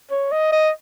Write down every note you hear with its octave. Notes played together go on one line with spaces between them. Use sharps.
C#5
D#5
D#5